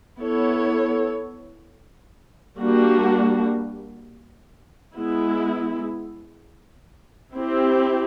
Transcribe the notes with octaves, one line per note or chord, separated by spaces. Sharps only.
B3 E4 A4 C#5
G3 A#3 D4 F#4
G#3 B3 E4
C4 E4 G4